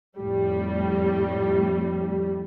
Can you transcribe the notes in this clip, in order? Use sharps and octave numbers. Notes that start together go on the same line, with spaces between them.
F2 A2 G3